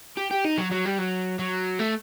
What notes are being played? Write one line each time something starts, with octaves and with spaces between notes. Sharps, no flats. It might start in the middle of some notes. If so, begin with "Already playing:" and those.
G4
G4
D#4
F#3
F#3
G3
F#3
F#3
A3